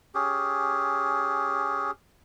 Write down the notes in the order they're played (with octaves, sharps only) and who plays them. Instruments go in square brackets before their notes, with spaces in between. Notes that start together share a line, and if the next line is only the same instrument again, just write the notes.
[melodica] C#4 G4 G#4